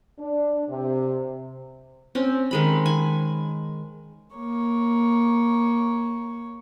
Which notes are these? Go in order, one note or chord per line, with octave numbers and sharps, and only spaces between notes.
D4
C3
C4 C#4
D#3 G#3 B5
G#5
A#3 C#5